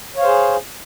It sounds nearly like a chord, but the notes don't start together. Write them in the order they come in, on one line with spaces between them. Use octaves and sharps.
C#5 F5 C5 G#4